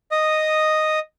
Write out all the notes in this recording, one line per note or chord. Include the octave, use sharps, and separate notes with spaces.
D#5 D#6